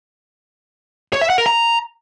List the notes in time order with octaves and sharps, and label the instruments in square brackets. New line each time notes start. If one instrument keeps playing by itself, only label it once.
[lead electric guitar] C#5
E5
F#5
A#4
A#5